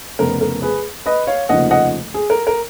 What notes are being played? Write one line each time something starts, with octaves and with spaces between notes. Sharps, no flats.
F1 F2 C#3 F3 B3 A#4
A#4
G#4 B4
B4 D#5
C#5 F5
F1 D#2 C#3 F3 D#5 F#5
D#5 F#5
G#4
A#4
A#4